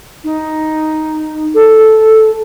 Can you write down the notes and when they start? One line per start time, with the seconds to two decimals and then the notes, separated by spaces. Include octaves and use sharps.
0.24 D#4
1.54 A4